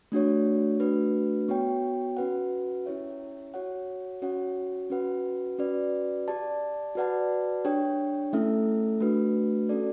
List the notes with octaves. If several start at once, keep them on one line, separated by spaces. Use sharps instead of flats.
A3 D4 F#4 C#5
A3 D4 F#4 B4
B3 F#4 C#5 G5
C#4 F#4 B4 F#5
C#4 E4 G4 C#5 E5
F#4 C#5 F#5
C#4 F#4 C#5 F#5
C#4 F#4 B4 F#5
C#4 F#4 B4 D5
G4 D5 A5
F#4 B4 D5 F#5 A5
D4 G4 C#5 G5
A3 C#4 E4 A4 E5
A3 D4 F#4 B4
C#4 F#4 A4 D5